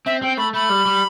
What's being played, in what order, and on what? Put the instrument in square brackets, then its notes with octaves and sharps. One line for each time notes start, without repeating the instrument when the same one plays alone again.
[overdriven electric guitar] C4 [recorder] E5
[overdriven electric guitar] C4 [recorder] G5
[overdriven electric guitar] A3 [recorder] B5
[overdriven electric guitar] A3 [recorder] B5
[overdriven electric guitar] G3
G3